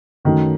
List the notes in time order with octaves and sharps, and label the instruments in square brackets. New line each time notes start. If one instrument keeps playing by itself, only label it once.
[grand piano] F#2 F#3 A3 D#4 [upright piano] D#3